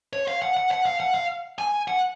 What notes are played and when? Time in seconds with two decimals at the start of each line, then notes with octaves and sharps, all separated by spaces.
0.13 C#5
0.28 F5
0.42 F#5
0.57 F#5
0.71 F#5
0.86 F5
1.00 F#5
1.14 F5
1.59 G#5
1.88 F#5